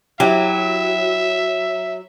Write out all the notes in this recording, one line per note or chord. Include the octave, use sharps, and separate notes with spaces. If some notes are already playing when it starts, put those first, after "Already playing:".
F#3 E4 G4 E5